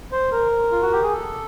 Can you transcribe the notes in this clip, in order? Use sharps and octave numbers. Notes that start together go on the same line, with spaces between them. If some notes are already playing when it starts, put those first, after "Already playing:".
C5
A#4
F4
F#4
G4
G#4
A4